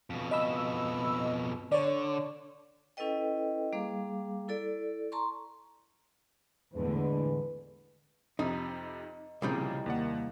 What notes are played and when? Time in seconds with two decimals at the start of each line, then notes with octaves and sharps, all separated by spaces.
0.10 F2 B2
0.31 D#5 B5 E6
1.72 D3 C#5 D5
2.97 C#4 E4 A4 B4 D#5 G5
3.73 G3 A#3 G#4 F5 D6
4.48 E4 A4 D5
5.12 A5 A#5 C6 C#6
6.75 E2 A2 D3 G#3 B4
8.39 F2 C3 D#4
9.42 C2 A#2 C#3 F3 G3 D#4
9.86 D#2 A#3 D5 F#5